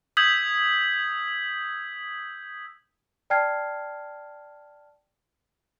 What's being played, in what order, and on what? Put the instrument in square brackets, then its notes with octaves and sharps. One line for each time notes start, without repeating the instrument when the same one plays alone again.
[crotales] D#6 E6 G6 G#6 B6 F#7
[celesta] D5 G5 A5 F6 G#6 C7